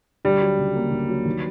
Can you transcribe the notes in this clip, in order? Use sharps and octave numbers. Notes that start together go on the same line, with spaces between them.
D2 G3
F#3
C#3
A#3
D2
F#3
D#2